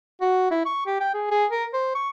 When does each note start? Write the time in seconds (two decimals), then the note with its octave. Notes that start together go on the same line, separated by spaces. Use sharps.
0.21 F#4
0.51 E4
0.66 C#6
0.86 G4
1.00 G5
1.14 G#4
1.31 G#4
1.51 A#4
1.73 C5
1.95 C#6